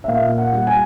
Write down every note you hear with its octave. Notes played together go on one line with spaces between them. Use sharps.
E5
A#2 F5
F#5
G3
G#5